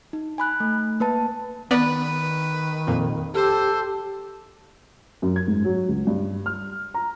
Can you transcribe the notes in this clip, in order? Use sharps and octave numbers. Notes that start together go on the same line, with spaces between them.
D#4
G#5 B5 F#6
A3
A#3 B4 A5
D#3 B3 B4 D5
F2 A#2
G4 A4 C5
F#2
G#6
G#2
F#3
C#2
G2
F6
A#5